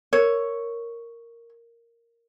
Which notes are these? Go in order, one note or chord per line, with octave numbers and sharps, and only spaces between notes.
A#4 C#5